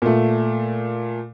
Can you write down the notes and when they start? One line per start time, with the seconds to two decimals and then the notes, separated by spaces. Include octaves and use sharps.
0.02 A#2 A3